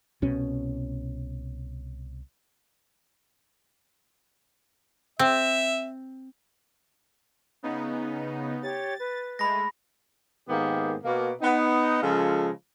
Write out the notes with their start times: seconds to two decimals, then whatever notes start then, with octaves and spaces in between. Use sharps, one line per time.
0.22 C2 B2 C#4
5.19 C4 E5
7.63 C#3 B3 D#4
8.63 G4 C#5 A6
8.98 B4
9.39 G#3 A3 B5 A#6
10.49 G#2 D#3 A#3 B3 G4
11.04 B2 A#3
11.42 B3 D#4
12.02 C#3 F3 G#3 F4 A4